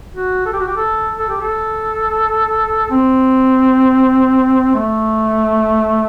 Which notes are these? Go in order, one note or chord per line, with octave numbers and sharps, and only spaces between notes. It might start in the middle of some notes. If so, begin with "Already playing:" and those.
F#4
A4
G4
F#4
G4
A4
A4
G4
A4
C4
A3